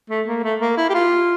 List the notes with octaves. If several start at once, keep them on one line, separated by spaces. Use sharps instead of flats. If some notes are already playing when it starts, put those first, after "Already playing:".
A3
A#3
A3
A#3
E4
G4
F4